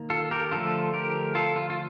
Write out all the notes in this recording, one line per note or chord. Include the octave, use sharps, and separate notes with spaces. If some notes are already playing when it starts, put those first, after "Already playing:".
Already playing: D#3 A#3
F4 A4
G4 A#4
D3 F3 A3 F4 A4
G4 A#4
F4 A4
F4
F4